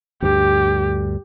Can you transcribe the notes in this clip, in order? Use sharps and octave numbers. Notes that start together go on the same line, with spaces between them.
D2 G2 G4